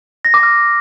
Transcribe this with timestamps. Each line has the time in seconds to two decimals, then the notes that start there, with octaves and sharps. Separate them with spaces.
0.25 A#6
0.34 D6
0.43 F6